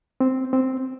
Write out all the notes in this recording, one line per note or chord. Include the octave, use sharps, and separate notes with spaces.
C4
C4